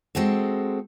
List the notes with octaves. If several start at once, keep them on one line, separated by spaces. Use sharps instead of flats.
G#3 C4 F#4 A4